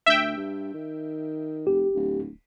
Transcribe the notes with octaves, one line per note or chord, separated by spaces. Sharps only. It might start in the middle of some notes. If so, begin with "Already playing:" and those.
D2 E5 G5
G2
D#3
F1 G4
D1